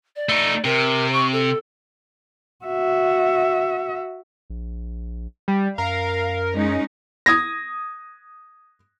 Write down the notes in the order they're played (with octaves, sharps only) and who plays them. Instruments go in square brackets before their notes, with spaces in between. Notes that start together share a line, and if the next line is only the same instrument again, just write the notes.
[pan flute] D5
[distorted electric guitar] A3 D#4
[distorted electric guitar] C3 [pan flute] A#4
[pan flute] C#6
A4
[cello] F#4 E5
[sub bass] A#1
[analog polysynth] G3
[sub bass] F#2 [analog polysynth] A#4 [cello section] F5
[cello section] G#3 C#4 D#4
[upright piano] D#6 G#6 A#6